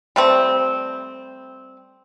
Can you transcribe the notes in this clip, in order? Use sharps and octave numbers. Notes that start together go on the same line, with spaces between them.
G3 A3 C4